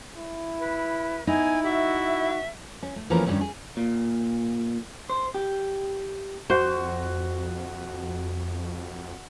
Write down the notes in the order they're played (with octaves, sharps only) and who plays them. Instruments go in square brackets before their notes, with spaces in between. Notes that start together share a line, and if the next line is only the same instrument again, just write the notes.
[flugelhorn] E4
[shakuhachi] B4
[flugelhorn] B3 [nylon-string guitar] D#4 [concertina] E4 [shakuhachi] G#5
[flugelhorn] F#4 [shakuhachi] E5
[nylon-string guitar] C#4
A3
E3 F3 A3 A#3 C#4 A#4
G2 D#3 E3 G3 C4 C#4
G#4
[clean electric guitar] A#2
C5
G4
[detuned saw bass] F2 [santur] F#4 [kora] C5